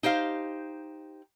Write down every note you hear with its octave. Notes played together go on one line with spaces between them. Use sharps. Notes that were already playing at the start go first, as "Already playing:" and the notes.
D#4 G4 C5 F5